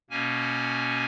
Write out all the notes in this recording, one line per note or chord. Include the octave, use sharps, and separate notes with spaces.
B2 A#3 C#4 G#5